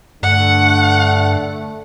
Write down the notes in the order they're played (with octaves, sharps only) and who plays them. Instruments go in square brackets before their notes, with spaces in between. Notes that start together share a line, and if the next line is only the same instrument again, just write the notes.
[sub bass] G2 [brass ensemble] D3 A3 [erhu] F#5